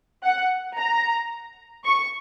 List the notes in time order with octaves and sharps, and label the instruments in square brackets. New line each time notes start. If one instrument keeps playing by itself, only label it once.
[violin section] F#5
A#5
C#6